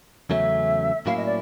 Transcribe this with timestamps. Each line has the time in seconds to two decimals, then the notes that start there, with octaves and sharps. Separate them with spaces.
0.30 E2 C#3 F#3 A3 C#4 E5
1.06 A2 F#3 A#3 C#4 E4 F5
1.17 D#5
1.25 D5